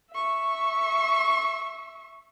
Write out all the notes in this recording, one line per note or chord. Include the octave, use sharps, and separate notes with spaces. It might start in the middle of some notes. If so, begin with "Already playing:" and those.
E5 C#6